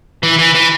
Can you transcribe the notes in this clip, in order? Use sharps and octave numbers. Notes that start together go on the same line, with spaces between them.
E3
E3
E3